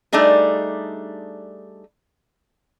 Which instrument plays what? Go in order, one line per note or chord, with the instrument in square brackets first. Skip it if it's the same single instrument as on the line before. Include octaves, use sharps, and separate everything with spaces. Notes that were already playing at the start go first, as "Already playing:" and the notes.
[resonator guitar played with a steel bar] G3 A3 D4 D#4 G#4